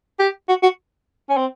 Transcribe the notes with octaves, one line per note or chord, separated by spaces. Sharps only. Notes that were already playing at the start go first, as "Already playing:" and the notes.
G4
F#4
F#4
C#4
C4